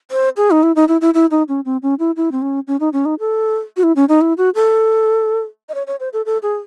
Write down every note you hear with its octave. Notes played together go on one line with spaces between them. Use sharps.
C5
G#4
D#4
E4
D#4
E4
E4
E4
D#4
C#4
C4
C#4
E4
E4
C4
C#4
C#4
D#4
C#4
D#4
A4
F#4
E4
C#4
D#4
E4
F#4
A4
D#5
C#5
C#5
C5
A4
A4
G#4